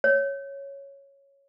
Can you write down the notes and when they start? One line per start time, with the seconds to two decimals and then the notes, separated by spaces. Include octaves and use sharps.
0.04 C#5